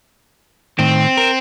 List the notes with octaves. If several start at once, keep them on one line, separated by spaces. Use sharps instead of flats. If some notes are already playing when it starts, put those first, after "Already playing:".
A2 D#3 C4
A#4